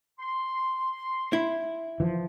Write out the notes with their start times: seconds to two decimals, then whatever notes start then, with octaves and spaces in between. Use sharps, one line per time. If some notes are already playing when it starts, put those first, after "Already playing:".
0.19 C6
1.33 E4
2.00 E3 F3